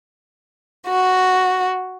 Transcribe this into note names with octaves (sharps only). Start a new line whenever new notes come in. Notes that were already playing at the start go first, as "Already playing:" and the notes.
F#4